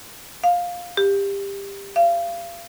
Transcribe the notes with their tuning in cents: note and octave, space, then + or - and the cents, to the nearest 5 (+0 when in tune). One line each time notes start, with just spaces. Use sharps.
F5 +10
G4 +20
F5 -30